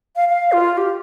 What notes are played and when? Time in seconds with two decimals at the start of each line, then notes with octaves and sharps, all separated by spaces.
0.16 F5
0.29 F5
0.52 F4
0.77 G4